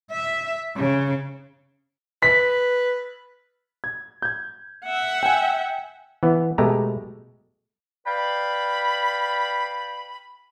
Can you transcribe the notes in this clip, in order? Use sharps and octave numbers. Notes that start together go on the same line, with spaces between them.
E5
C#3
B4 B6
G#6
G6 G#6
E5 F#5
G5 G#5
E3 B3
B2 G#3 A3 G4 A#5
B4 D5 F5 G5 B5